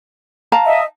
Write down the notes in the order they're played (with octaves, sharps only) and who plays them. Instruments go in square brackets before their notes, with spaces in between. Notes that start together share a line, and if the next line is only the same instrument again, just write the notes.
[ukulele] F5 A5 A#5
[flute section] D#5 E5